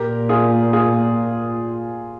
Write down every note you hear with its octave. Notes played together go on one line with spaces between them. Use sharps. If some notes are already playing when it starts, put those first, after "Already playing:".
Already playing: A#2 G4 A#4
F4 G#4
F4 G#4